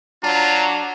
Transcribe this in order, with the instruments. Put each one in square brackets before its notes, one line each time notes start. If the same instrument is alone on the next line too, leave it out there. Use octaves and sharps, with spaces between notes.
[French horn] F#3 [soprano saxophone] D4 [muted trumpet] F4 [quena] A#5